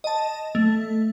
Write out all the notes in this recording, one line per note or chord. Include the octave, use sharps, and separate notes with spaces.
D#5 A5
A3